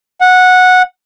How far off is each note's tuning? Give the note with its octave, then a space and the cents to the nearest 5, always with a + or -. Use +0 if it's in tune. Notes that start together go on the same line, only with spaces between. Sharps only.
F#5 -10